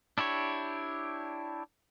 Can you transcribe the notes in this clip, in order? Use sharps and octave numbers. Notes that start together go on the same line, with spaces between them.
D4 E4 G4 C#5